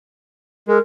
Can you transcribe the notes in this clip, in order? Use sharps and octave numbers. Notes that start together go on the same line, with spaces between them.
G#3 A#4